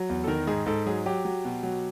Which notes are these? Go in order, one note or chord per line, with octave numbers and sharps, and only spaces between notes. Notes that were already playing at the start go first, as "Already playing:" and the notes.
Already playing: F#3
E2
A4
D#3 A#4
G#2 G#4
G#2 A4
F#3 G#4
F#3 G4
F#3
B2
F#3